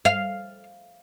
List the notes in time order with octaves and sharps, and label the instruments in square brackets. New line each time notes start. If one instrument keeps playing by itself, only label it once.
[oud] F5